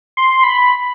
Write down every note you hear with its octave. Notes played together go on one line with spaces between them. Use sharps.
C6
B5